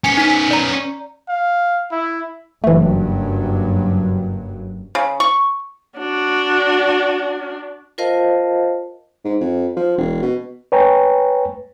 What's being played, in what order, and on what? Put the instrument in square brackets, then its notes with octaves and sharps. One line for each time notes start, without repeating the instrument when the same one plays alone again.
[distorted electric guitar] B3 C#4 [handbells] G#5 C#7
[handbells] D#4 B6
D5 A#5
[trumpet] F5
E4
[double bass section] F#1 G2 F#3 [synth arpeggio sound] E3 A3
[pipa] C#3
C#6
[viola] D4 F#4
[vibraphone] F4 A#4 C5 D#5 F5 A5
[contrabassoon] G#2
F2
F3
E1
B2
[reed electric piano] B4 C#5 G5 G#5 A#5